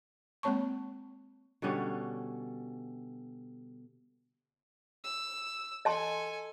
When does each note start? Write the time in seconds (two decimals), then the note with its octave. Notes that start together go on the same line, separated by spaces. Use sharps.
0.43 G#3 A#3 C4 C#5 A5 C#6
1.62 B2 D3 G3 C#4
5.04 E6
5.85 A4 D#5 G#5 A5 C6